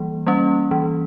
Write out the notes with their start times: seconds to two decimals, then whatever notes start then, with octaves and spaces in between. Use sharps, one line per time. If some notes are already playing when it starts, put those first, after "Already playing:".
Already playing: E3 G3 A#3
0.27 G3 A#3 C#4
0.71 E3